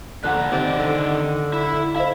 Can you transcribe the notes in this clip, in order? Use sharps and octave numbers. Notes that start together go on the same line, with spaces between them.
A#2 D3 F3 A#3 F#5 F#6
C3 D#3 D5
D3
E4
E4 C5 D#5 F5